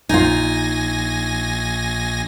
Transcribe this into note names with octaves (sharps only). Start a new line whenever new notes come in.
A#1 D#4 F4 G#5 A#6